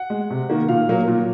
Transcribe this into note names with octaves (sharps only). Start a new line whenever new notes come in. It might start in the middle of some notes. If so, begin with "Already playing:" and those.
Already playing: F#5
G#3
C3
D#3 A#3
A#2 F5
F#3 A#3
A#2